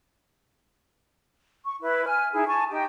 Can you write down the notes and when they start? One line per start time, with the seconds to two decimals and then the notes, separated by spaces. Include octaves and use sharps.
1.65 C#6
1.81 E4 B4
2.06 G#5 F6
2.33 D#4 E4 G#4
2.47 G#5 A5 C#6
2.71 D#4 G4 G5